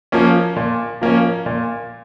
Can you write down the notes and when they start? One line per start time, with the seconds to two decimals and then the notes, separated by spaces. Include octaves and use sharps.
0.12 F3 A#3 C#4
0.56 A#2
1.01 F3 A#3 C#4
1.46 A#2